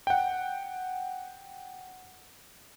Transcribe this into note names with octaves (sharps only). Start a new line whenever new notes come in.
F#5 G5